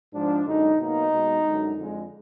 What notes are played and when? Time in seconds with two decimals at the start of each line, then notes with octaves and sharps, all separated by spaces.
0.13 G#2 F3 G#3 D4
0.45 F#2 D3 G#3 D#4
0.78 B2 F#3 A#3 D#4
1.11 B2 G#3
1.45 F#2 D3 G#3
1.77 F2 D3 G#3